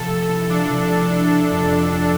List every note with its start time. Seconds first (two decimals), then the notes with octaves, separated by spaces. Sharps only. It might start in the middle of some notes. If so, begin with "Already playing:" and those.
Already playing: C3 F3 A4
0.09 A3
0.29 E4
0.49 F3 D4
0.69 C3
0.91 A3
1.11 E4
1.30 C3
1.51 F2
1.71 F3
1.91 A3